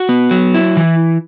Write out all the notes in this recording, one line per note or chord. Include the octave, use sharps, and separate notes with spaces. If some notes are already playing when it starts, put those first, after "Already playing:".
Already playing: F#4
B3
F#3
E4
E3